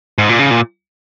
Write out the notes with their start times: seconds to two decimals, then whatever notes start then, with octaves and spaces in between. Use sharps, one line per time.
0.18 G#2
0.29 A#2
0.39 C#3
0.51 A#2